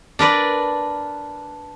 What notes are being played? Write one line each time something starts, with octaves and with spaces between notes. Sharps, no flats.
D4 A#4 B4 D5